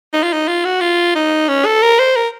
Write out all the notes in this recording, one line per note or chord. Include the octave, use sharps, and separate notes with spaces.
D#4
F4
D#4
F4
F#4
F4
D#4
C#4
A4
A#4
C5
A#4